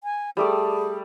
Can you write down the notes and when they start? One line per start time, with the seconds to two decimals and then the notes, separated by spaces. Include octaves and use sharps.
0.04 G#5
0.37 G3 A3 G#4 D5